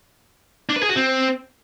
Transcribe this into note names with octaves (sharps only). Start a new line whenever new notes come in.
D4
B4
G#4
F#4
C4